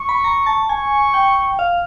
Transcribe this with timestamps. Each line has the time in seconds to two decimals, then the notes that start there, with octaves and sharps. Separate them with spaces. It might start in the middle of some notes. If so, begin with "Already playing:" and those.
Already playing: C#6
0.09 B5
0.24 A#5
0.46 A5
0.69 G#5 C#6
1.14 G5
1.59 F5